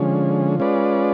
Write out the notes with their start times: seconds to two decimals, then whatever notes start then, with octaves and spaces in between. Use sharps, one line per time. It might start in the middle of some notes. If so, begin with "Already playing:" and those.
Already playing: D3 F3 G#3 C#4
0.60 G#3 C#4 F4 B4 D5